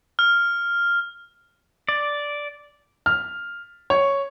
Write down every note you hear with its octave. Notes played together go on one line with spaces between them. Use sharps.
F6
D5
F6
C#5